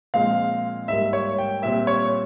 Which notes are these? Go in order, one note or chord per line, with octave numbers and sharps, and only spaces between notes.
A#2 F3 G#3 C4 F5
G#2 G3 A#3 E5
C#5
G5
A#2 G3 C4 E5
C#5